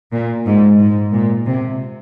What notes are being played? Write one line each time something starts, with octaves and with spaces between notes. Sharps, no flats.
A#2
G#2
G#2
A#2
C3